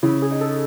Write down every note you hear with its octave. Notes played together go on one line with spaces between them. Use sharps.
C#3 E4
G#4
D#4
A4